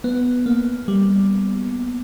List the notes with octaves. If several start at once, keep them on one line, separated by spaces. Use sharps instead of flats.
B3
A#3
G3